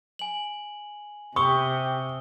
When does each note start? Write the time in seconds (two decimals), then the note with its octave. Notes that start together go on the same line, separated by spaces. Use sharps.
0.19 G#5 F#7
1.36 C3 G4 C#6 D#6 E6 G7